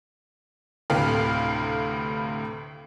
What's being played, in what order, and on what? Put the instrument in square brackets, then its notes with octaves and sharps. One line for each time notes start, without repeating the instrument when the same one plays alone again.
[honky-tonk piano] D2 A2 C3 B4 F5